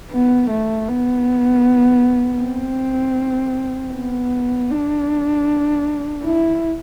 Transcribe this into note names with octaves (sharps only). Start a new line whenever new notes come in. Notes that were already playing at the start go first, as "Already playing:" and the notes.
B3
A3
B3
C4
B3
D4
E4